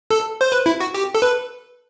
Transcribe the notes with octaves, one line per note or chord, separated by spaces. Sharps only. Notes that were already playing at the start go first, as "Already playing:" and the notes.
A4
C5
B4
E4
F#4
G4
A4
B4